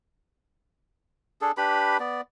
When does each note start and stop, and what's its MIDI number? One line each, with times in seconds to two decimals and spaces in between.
1.41 1.52 62
1.41 1.52 68
1.41 1.52 69
1.57 1.97 62
1.57 1.97 67
1.57 1.97 71
1.57 1.97 83
2.00 2.21 59
2.00 2.21 74